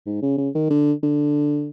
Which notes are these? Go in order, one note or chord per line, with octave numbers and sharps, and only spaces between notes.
G#2
C#3
C#3
D#3
D3
D3